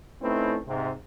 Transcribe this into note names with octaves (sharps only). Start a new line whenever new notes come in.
A3 C4 C#4 D#4 E4 B4
G#2 C3 C4